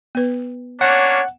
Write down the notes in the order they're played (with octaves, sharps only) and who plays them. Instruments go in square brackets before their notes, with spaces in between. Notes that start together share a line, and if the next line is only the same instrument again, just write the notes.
[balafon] B3 B4
[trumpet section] A#3 C#4 D4 [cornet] C#5 [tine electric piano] F#5